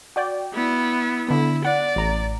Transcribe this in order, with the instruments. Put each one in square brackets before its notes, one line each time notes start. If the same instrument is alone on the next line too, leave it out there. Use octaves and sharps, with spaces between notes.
[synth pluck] F#4 D5 G5
[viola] B3 E4
[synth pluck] D3 B3 [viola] E4
[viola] D5 [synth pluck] F#5
[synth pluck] A1 A#5